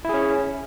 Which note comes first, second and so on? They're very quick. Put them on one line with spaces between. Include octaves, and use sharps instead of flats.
E4 G#4 C#4